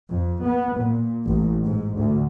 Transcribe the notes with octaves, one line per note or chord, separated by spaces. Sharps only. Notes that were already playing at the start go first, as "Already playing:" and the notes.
F2
B3
A#2
A1
G#2
D2